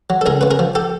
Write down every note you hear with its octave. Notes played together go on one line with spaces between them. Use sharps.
F#3
A4
C#2 G#4 A#4
C#3 B4
G#4 A#4
F3
G4 A4